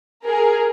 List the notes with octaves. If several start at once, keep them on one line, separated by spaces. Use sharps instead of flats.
G#4 A#4